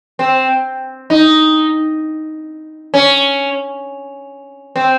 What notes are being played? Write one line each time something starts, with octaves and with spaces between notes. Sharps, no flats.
C4
D#4
C#4
C4